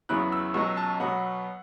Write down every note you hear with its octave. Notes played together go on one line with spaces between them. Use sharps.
E2 C#3 F#3 B3 E4 F#6
E6
C#2 B2 F#3 C#4 C#6
A5
B2 F#3 B3 F#5